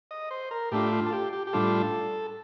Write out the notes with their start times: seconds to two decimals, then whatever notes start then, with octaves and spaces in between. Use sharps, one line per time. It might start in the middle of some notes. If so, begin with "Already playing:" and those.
0.11 D#5
0.31 C5
0.51 A#4
0.72 A2 A3 D4 F4 G4
0.92 F4
1.06 A4
1.13 G4
1.33 G4
1.47 G4
1.53 A2 G3 D4 F4 A4